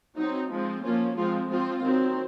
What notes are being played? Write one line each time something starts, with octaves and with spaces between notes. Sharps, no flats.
F#3 C4 D#4
F3 G#3 C4
F3 A#3 C#4 F4
F3 G#3 C4 F4
F3 C4 F4
D#3 F#3 C4